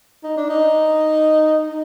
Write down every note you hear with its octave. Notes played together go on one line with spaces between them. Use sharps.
D#4
D4
D#4
D#4